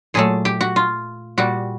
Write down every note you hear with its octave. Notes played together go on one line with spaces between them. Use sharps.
A#2 F#3 A3 G#4
G4
F#4
F4
A#2 G3 F#4